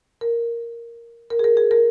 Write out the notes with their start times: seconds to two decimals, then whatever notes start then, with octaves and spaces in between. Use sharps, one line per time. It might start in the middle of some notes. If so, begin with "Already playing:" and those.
0.21 A#4
1.30 A#4
1.39 G#4
1.44 A#4
1.57 G#4
1.71 A#4